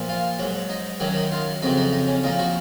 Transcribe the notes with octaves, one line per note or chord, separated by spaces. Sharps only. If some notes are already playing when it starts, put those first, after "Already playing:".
Already playing: A#2 F3
F4
G#2 F#3
D#4
F#2 D#3 F#3 C#4
D#4
F4
F2 C#3 F#3 D#4
D#4
D#4
C#4
A#2 F3 D#4
F#4